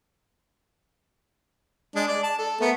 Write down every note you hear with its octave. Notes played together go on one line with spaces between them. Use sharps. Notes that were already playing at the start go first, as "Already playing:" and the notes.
G#3 D4
D5
A5
A4
A3 B3 A#4